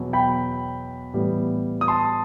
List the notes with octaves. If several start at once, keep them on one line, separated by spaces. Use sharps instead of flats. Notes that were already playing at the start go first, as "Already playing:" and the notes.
Already playing: E2 B2 F#3
G5 B5
A2 E3 G3 B3
D#6
A5 C6